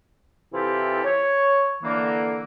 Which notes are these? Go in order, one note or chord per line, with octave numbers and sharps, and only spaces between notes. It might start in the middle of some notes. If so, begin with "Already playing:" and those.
C3 E3 E4 F4 G4 A4
C#5
D3 E3 A#3